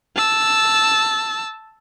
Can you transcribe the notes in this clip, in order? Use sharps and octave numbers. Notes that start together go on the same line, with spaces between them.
A5 E6